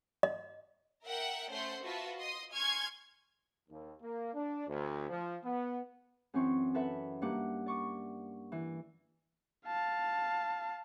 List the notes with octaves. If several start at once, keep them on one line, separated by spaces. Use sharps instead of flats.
D#5
A#4 E5 F#5 G5
A3 C#4 C5 F#5 C6 G6
F4 F#4 B4 E5 A5
D#5 C6 D#6
G#5 C6 C#6 F6 G#6
D#2
A#3
D4
D2
F3
B3
F#2 E3 C4 C#6
A4 B4 E5 F#5 B5
G2 A#3 F#5 D6
D5 C#6 D6
E3
F5 A5